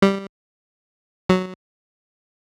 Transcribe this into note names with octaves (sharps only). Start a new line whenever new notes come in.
G3
F#3